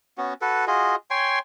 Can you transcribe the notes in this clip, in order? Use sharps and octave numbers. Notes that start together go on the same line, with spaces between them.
B3 C#4 F#4
F#4 A4 B4
F4 F#4 G#4 D#5
C#5 G5 G#5 C6